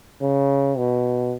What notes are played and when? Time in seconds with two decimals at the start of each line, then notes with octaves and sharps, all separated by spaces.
0.22 C#3
0.77 B2